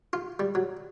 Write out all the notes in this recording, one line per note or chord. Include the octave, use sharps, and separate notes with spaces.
F4
G3
F#3